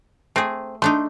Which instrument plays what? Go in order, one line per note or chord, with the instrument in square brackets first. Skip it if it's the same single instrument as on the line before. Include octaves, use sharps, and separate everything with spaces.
[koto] A3 G#4 [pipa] C4
[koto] A3 D4 D#4 [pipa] C6